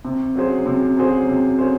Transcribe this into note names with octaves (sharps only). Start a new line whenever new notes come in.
C3
F#3 C#4 G#4 C5
C3
F#3 C#4 G#4 C5
C3
F#3 C#4 G#4 C5